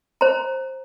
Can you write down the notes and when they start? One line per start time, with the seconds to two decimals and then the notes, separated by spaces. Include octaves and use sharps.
0.21 C5 A#5